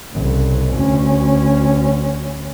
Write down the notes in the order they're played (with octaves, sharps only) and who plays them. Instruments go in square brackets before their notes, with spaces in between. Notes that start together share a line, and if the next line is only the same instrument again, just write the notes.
[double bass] C2 C#3
D2 C#4